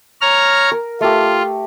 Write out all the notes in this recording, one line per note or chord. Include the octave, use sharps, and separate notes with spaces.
C#5 A#5 F6
A#4
A3 F4 G4